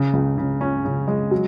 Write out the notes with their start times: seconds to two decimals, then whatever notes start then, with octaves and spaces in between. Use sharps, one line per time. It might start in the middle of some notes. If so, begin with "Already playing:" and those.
Already playing: C#3
0.13 C#2
0.38 C#3
0.61 C#4
0.85 C#3
1.08 G#3
1.31 F#3